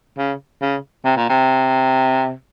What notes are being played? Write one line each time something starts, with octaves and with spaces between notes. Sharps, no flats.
C#3
C#3
C3
A#2
C3